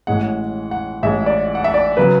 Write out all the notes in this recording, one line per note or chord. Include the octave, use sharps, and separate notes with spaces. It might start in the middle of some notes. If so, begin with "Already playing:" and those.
A1 A2 G#3 F#5
F#5
A1 A2 G#3 E5
D5
F#5
E5
D5
C#3 F#3 B4